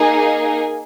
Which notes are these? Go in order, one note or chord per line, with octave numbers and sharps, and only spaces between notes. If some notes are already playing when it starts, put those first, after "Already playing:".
Already playing: A#3 D#4 G#4